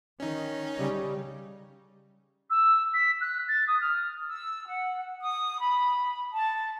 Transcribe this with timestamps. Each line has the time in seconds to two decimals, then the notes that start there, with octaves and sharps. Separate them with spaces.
0.20 D#3 C#4 D#4
0.77 C#3 G3
2.50 E6
2.94 B6
3.21 F#6
3.48 A6
3.68 D#6
3.81 F6
4.28 E6
4.67 F#5
5.21 D#6
5.59 B5
6.32 A5